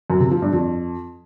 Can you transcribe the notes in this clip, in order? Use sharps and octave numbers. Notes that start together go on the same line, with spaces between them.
F#2
C3
F3
G2
F2